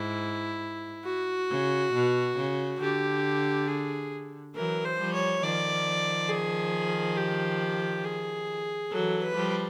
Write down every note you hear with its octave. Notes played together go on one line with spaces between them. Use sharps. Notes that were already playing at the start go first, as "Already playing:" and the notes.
Already playing: G#2 E4
F#4
C#3
B2
C#3
D3 G4
G#4
E3 F#3 A#4
C5
F3 G3
C#5
D#3 F3 D5
G#4
G4
G#4
E3 F#3 A4
B4
F3 G3